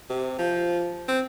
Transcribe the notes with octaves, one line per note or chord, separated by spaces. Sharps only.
C3
F3
C4